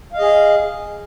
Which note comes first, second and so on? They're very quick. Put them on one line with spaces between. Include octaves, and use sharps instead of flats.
F5 D#5 G#4